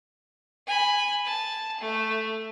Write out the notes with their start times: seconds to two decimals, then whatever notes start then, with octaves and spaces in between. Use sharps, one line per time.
0.67 G#5 B5
1.25 A5
1.81 A3